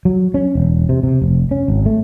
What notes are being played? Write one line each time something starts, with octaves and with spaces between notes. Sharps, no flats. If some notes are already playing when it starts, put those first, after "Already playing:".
F#3
C#4
E1
C3
C3
F1
C#4
G#1
A3